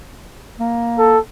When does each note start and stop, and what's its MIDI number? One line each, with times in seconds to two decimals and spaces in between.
0.59 1.17 58
0.99 1.19 69